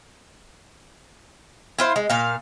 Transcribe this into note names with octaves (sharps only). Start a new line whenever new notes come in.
E4 F4 C5
G#3
A#2 F5